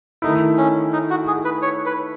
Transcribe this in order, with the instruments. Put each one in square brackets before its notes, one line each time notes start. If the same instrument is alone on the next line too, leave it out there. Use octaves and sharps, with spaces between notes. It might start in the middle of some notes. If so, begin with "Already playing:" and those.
[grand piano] D#3 A3 E4 [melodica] D#4
[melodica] C#4
D#4
F#4
G#4
B4
C#5
B4